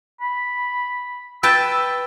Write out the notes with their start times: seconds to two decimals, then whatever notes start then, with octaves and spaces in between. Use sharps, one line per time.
0.20 B5
1.43 B4 G5 A5 E6